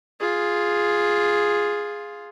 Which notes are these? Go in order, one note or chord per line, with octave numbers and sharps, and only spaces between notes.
F4 G#4